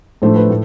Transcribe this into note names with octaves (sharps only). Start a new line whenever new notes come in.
A2 F3 A3 D4 C5
B4
A2